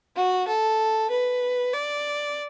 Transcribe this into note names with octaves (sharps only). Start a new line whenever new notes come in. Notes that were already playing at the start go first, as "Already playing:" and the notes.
F#4
A4
B4
D5